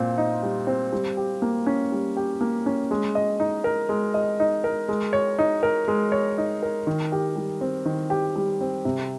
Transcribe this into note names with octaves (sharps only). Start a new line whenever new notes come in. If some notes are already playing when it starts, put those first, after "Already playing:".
Already playing: A#2 C4
D#4
G3
C4
G3
G4
A#3
C#4
G3
G4
A#3
C#4
G#3
D#5
D#4
A#4
G#3
D#5
D#4
A#4
G#3
C#5
D#4
A#4
G#3
C#5
D#4
A#4
D#3
G4
G3
C4
D#3
G4
G3
C4
C3